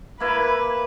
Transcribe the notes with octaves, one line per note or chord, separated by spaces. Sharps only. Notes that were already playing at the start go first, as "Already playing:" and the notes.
A#3 E4 B4